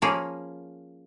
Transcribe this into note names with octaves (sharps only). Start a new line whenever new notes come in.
F3 A#3 C#4 G#4